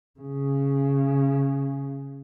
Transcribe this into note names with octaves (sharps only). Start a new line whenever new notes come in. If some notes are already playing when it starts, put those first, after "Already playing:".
C#3